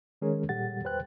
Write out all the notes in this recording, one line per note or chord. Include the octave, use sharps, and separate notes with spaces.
D#3 G#3 C#4 G#4 A#4 C#5
A#2 G3 G4 A4 F#5 A6
E2 B4 C5 G5 F#6